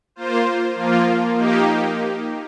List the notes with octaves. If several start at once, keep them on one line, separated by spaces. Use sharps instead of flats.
A#3 F4 C5
F3 A#3 F4
A#3 D#4 G4